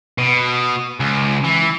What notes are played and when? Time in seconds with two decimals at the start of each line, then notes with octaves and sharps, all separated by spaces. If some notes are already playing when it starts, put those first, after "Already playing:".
0.18 B2
1.00 C#2
1.44 E3